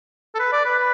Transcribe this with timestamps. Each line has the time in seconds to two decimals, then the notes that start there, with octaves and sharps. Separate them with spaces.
0.35 A4
0.39 B4
0.52 D5
0.65 B4
0.78 B4